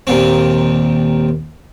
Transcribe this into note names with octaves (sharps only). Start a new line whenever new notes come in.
D#2 A#2 C4